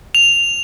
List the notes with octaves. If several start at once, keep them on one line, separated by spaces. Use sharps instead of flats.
F7